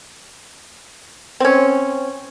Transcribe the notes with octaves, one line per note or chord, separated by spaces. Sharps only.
C4 C#4